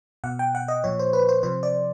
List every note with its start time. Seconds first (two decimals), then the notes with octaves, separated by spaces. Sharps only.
0.24 B2 F#5
0.39 G5
0.55 F#5
0.68 D#5
0.84 A#2 F3 C#5
0.99 C5
1.13 B4
1.29 C5
1.43 C3 F3 C5
1.63 D5